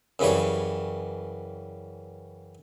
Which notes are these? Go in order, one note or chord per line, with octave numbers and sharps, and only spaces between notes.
F#2 C#3 E3 G3 C#5